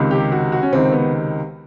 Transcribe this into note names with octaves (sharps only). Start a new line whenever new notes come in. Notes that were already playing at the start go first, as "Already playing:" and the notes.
Already playing: C#2 C3 D#3
G4
F#4
F#4
C#4
C#2 C3 D#3 C4
B3